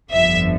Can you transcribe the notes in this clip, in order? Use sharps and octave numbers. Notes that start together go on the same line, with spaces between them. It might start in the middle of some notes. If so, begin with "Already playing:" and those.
G1 F2 D3 F3 E5